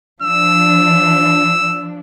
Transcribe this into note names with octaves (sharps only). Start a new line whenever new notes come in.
F3 D4 E6